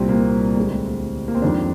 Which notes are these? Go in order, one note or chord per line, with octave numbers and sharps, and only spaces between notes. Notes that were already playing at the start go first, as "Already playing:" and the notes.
Already playing: C2 A#2 G3 C4
A#3
C4
D2 D3 G#3
A#3
C4
F2 D#3 G#3 D4